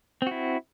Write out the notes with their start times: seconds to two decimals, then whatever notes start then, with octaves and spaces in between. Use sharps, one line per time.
0.22 C4
0.27 F#4
0.31 E4